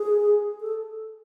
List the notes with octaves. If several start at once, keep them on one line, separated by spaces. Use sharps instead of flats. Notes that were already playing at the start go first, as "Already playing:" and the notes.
Already playing: G#4
A4